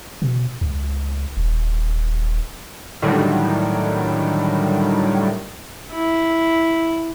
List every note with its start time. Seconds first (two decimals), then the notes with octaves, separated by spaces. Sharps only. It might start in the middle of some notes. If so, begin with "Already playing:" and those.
0.22 B2
0.61 C#2
1.37 D#1
3.02 A2 D3 D#3 F#3 G3
5.92 E4